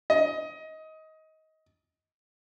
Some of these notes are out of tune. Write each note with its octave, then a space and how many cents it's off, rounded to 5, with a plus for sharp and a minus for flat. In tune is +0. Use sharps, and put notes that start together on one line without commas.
D#5 +20